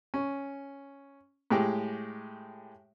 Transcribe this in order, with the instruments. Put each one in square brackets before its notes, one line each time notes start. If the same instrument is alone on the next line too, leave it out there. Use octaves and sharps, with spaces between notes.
[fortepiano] C#4
A2 G#3 G4 G5